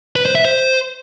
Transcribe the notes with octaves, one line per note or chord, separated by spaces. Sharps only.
B4
C5
E5
C5